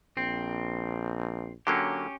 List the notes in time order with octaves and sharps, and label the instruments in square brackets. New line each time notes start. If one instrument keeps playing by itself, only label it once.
[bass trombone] A#1 [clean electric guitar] C4
[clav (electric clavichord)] D3 F#3 A#3 [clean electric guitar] C#4 G4